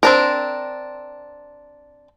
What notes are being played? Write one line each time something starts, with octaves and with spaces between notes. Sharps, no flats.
C4 D4 A#4